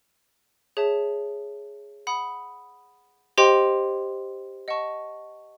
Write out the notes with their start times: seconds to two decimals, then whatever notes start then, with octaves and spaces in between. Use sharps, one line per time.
0.77 G#4 C#5 E5 A5
2.07 F#5 B5 D#6
3.38 G4 C5 D#5 G5 C6
4.68 D#5 F#5 A5 C#6